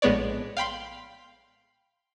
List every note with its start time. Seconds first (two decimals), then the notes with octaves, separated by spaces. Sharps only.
0.02 A#1 A2 G#3 B3 C#5 D5
0.57 F5 G5 B5 C6